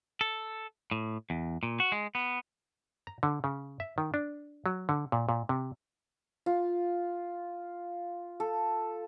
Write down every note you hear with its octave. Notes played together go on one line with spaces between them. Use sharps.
A4
A2
E2
A#2
F#4
G#3
B3
A#5
D3
C#3
E5
D#3
D4
F#3
D3
A#2
A#2
C3
F4
A4